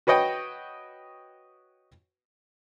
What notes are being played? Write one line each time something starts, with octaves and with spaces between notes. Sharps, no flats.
F#4 B4 C#5 D#5 G5